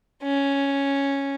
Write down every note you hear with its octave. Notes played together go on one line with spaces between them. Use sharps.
C#4